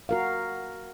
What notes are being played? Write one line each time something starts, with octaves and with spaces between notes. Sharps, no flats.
F#4 A#4 F5